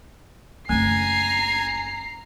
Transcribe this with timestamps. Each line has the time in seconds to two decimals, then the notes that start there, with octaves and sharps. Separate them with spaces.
0.69 F#1 A3 C4 G#5 A#5 C7